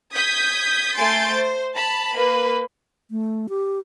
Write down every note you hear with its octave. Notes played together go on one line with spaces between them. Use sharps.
D#6 G6 G#6 B6
A3 G#5 C6 G6 A6 D7
C5
A5 B5
A#3 B4
A3
G4